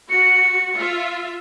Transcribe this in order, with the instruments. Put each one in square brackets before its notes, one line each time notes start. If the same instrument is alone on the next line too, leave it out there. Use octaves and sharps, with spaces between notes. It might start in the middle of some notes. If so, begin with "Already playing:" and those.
[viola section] F#4 [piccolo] C#7
[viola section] F4 E5